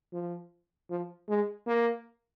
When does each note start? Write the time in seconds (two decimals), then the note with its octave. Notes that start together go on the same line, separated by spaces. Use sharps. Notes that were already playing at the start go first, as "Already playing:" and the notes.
0.13 F3
0.90 F3
1.29 G#3
1.67 A#3